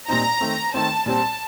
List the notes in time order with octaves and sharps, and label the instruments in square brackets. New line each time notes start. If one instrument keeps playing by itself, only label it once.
[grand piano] A#2 G3 C4 D#4 [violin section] A#5
[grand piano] D#3 A3 C4
[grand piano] D#3 A3 C4 [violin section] A5
[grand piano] A#2 G3 C4 [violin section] A5